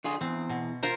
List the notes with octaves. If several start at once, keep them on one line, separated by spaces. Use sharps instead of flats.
D3 F4 G#4
E2 C4
B2
F4 A#4 C5